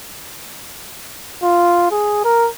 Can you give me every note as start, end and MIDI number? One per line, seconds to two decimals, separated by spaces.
1.43 1.87 65
1.92 2.24 68
2.25 2.49 70